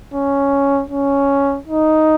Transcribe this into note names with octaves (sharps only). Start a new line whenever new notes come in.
C#4
C#4
D#4